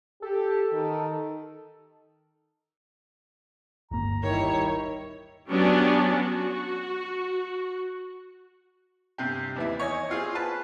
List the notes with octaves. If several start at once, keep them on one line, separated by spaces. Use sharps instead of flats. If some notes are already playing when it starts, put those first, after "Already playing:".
G4 A4
D#3
D1 G1 A#3 A#5
D#3 G3 E4 C#5
F#3 B3 C#4 D4 G4 D5
F#4
G2 C3 G4
D#2 E3 E4
C#5 D#5 G#5
C4 F4 G#4
B4 A5